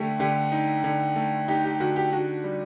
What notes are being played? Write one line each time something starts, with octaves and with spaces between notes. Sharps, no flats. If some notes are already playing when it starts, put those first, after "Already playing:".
Already playing: D3 A3 G4
D3 G4
D#4
D3
A3
D#4 G4
G4
D3 F#4
G4
D4 F#4
G3